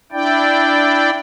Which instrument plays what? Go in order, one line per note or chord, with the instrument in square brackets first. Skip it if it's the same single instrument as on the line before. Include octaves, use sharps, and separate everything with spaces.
[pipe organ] D4 E4 D5 G5